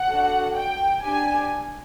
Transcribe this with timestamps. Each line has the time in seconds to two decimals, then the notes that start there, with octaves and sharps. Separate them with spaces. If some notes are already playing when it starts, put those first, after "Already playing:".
Already playing: F#5
0.09 D4 F#4 A4
0.56 G5
1.04 D4 G4 G#5